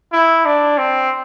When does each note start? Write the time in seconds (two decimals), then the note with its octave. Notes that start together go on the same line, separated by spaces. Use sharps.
0.12 E4
0.45 D4
0.78 C4